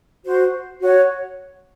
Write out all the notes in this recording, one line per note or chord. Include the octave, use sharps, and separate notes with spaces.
F#4 C5
F#4 C#5